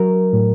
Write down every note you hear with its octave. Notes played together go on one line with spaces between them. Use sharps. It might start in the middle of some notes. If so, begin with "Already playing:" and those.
Already playing: F#3 A#4
A2